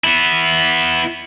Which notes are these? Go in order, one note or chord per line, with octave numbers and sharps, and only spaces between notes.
B3 E4